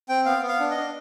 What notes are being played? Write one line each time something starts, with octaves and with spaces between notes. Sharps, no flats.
C4 G5
B3 F5
B3
F5
D4
D#5
D4